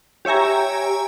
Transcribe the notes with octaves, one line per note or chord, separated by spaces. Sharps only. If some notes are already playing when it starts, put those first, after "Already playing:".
G4 C#5 E5 G#5 A#5